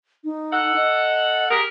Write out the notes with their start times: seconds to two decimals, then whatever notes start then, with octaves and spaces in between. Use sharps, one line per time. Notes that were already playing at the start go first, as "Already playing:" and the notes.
0.24 D#4
0.52 A4 F#5
0.76 D#5
1.51 G4 G#4 A#4